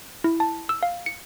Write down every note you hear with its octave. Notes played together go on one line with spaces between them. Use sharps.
E4
A5
E6
F5
C#7